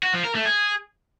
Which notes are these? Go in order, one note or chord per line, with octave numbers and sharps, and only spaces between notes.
F#4
F3
A#4
A3
G#4